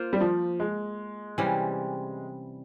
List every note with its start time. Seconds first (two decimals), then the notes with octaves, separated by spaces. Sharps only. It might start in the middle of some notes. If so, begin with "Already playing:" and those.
Already playing: A#3 F4 C5
0.13 G3
0.21 F3
0.60 G#3
1.38 C3 E3 G3 C#4